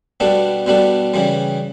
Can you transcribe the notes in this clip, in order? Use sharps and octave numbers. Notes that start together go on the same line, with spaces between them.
B2 G3 B3 D4 A4
B2 G3 B3 D4 A4
C#3 E3 G3